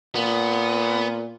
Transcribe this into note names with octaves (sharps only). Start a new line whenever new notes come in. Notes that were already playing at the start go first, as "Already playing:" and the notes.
A#2 B3